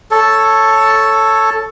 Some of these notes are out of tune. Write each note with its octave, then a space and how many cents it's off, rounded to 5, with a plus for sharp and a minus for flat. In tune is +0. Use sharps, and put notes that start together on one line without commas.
A4 +0 C#5 +0